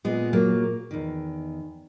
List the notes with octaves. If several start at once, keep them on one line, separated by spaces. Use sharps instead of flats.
A#2 G#3 B3
F#3 A#3
E2 D#3